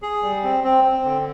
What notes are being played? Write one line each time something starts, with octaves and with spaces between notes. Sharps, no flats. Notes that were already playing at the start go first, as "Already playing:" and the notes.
G#4
G3
C4
C4
C4
D3